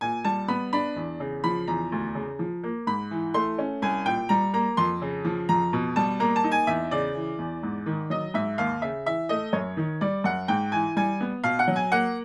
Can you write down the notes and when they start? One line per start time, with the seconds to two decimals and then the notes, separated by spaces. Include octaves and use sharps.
0.01 A#2 G#5
0.24 G3 A5
0.48 B3 B5
0.73 D4 B5
0.96 E2
1.20 C#3
1.44 F3 B5
1.67 E2 A#5
1.92 D2
2.15 C#3
2.39 F3
2.64 A#3
2.87 G#2 B5
3.11 E3
3.34 A3 C6
3.59 C#4
3.82 C2 G#5
4.06 A#2 G5
4.29 G3 A#5
4.54 A#3 A#5
4.77 F2 C6
5.02 C#3
5.25 F3
5.49 F2 A#5
5.73 B2
5.96 G3 A5
6.20 A#3 A#5
6.36 A5
6.44 D#4
6.52 G#5
6.67 E2 E5
6.91 C#3 D5
7.15 E3
7.39 E2
7.63 G#2
7.86 D#3
8.10 F#3 D#5
8.34 G#2 E5
8.58 D#2 F5
8.82 C#3 E5
9.06 E3 E5
9.29 A3 D#5
9.53 F#2 C#5
9.77 D#3
10.01 G3 D5
10.24 F#2 F#5
10.48 G#2 G5
10.72 E3 G#5
10.96 G3 G#5
11.20 B3
11.44 B2 F5
11.59 F#5
11.68 F#3
11.76 G#5
11.92 A#3 F#5